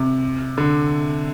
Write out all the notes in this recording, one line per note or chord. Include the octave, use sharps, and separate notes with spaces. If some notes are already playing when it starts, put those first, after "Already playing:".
Already playing: C3
D3